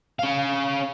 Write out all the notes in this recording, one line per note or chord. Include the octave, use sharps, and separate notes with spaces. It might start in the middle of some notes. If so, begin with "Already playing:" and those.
C#4 F5